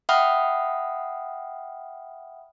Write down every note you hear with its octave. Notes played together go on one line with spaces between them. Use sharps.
E5 F#5 G5 B5 D#6 F6